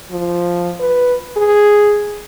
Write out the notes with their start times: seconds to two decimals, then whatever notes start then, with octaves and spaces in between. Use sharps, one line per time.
0.11 F3
0.80 B4
1.37 G#4